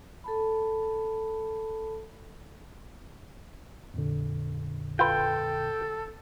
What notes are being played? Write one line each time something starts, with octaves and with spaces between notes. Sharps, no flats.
A4 A5 B5
F2 A#2 D3
F4 A4 B4 G5